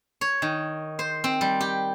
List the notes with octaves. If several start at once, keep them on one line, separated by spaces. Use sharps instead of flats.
C#5
D#3
C5
C4
G3
G4